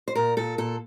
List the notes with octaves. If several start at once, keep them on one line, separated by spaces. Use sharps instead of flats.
C5
A#2 A#4
A#2 A4
A#2 A4